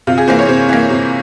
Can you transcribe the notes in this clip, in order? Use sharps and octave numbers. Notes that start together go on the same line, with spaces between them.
C3 F4
G#4
E3 A#3 C5
C#5
C3 C5
E3 A#3
C3